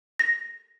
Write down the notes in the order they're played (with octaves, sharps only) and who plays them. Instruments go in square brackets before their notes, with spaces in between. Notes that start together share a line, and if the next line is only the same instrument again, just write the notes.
[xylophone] A#6